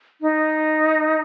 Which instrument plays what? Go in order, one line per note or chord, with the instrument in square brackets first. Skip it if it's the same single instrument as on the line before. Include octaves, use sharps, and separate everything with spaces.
[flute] D#4